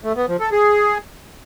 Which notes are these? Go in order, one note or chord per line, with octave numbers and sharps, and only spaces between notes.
A3
B3
F3
A4
G#4